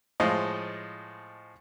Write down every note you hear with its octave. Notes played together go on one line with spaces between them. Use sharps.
A2 F3 G#3 D#5